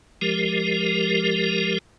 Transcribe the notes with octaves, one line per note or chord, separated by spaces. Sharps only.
F3 G#3 G4 A#4